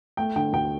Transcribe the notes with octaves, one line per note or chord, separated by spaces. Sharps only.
A3 G5
D3 G5
D2 G5